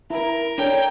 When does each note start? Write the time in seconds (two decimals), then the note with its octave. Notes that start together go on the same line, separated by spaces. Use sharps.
0.10 E4 A#4
0.58 D4 A4 C#5 G5